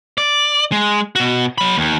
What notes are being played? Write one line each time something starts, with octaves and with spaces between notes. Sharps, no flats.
D5
G#3
B2 F#4
F#3 B5
D#2